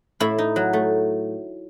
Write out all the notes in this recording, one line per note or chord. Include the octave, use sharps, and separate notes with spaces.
A2 E4
D#4
F#3
A3